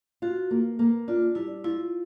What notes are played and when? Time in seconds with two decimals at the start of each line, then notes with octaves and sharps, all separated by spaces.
0.22 F4 F#4
0.51 A#3
0.79 A#3
1.08 D4 F4
1.35 G3 E4
1.64 E4 F4